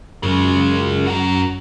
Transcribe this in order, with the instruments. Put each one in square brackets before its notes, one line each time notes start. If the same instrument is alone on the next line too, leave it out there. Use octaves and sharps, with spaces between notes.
[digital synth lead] F#2 [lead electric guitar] C#3 G#3
[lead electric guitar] F#4 A#4